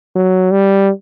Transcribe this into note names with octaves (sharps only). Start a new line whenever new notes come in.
F#3
G3